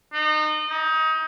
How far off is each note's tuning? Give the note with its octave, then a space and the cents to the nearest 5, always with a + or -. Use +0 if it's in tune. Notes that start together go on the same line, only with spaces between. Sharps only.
D#4 -30
D#4 +25